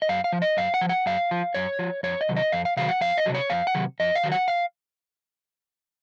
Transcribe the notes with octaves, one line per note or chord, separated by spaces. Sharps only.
D#5
F#2 F5
F5
F3
D#5
F#2 F5
F#5
F3
F#5
F#2 F5
F3
F#2 C#5
F3
F2 C#5
D#5
C3 D#3 F#3
D#5
F2 F5
F5
C3 D#3 F#3 F5
F#5
F2 F5
D#5
C3 D#3 F#3
C#5
F2 F5
F#5
C3 D#3 F#3
F2 D#5
F5
D#3 F#3
F#5
F5